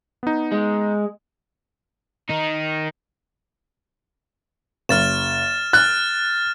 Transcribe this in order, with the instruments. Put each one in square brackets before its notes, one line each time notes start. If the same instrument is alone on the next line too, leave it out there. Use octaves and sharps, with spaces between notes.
[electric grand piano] B3 D#4
[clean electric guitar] G#3
[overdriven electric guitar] D#3 D#4
[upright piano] F#1 [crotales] F6 A6 E7
[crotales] F6 A6 [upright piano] F#6